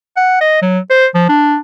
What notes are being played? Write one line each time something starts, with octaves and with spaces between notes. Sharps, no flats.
F#5
D#5
F#3
C5
F3
D4